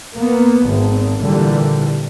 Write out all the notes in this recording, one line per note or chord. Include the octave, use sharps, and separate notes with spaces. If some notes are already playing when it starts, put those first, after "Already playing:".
A#3 B3
G#1
A#2 D3 E3 G3